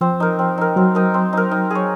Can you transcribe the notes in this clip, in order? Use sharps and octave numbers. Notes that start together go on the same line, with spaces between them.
F3 C4
D#4 A#4
C4
D#4 A#4
F#3 C4
D#4 A#4
C4
D#4 A#4
D#4
G#4 C#5